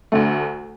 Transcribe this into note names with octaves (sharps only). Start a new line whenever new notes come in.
D2 D3 A3